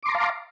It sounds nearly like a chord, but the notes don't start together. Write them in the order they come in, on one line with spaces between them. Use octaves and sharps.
D6 C6 A#5 A5 F5